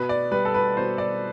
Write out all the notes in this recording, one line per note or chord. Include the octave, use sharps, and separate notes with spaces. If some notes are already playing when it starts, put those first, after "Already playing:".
Already playing: B2 B4
D5
G3 B4
A4
B4
B2 C5
D5